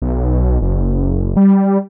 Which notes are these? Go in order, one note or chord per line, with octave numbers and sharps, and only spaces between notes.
B1
F#1
G3